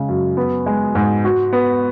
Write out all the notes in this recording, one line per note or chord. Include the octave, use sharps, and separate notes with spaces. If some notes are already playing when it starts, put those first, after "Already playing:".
Already playing: C#3 G#3
F#2
B3
G#3
G#2
F#4
B3